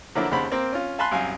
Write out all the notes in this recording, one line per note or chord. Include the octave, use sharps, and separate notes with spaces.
D3 F3 F#3 A#3 D4 E4
D#2 C#3 C5 F#5 B5
A#3 C4
C#4 F4
F5 G#5 A5 B5 C6 F#6
C2 F#2 F5 G#5